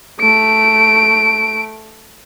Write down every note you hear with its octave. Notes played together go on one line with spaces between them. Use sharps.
A3 D7